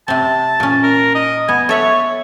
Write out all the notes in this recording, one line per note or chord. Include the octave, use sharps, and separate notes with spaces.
C3 C4 A5
A#2 C#4
A#4
D#5
B3 G#5
A4 C#5 E5 F#5